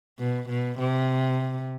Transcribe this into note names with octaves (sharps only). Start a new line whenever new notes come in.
B2
B2
C3